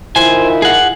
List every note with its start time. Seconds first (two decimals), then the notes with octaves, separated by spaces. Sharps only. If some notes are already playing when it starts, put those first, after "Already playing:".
0.16 D#3 E4 F4 C5 G#5
0.62 G#4 F#5